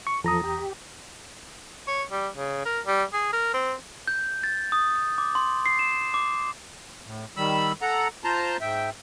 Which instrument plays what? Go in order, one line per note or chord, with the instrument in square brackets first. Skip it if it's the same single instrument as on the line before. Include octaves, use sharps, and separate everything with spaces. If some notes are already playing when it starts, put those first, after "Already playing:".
[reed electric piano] C#6
[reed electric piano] E2 A#5 D#6 [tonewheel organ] F3 A4
[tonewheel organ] G4
[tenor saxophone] C#5
G3
C#3
A#4
G3
G#4
A#4
C4
[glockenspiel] G6
A6
D#6
D6
C6
C7
E7
D6
[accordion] A2
D#3 G3 B5 E6
A4 F#5 A#5
F4 C5 A5 A#5 C6
G#2 E5 G5